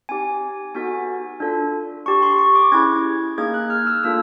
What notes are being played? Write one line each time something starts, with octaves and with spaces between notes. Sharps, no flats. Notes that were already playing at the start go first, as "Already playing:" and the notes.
C4 D#4 G4 G#5
B3 D#4 F#4 A4 G#5
D4 F4 A4
D4 G4 C#6
C6
C#6
D6
C#4 E4 G#4 G#6
A#3 D#4 G#4 G#6
F#6
F6
E6
A#3 D4 F4 A4 E6